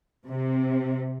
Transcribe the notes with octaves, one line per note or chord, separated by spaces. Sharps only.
C3